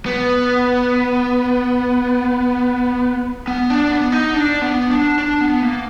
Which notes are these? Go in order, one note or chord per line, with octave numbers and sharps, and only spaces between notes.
B3
B3
D4
B3
D#4
D4
B3
D4
D4
B3
A#3